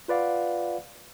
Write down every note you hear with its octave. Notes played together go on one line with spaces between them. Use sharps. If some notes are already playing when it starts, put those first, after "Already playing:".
F4 B4 D5 F5 F#5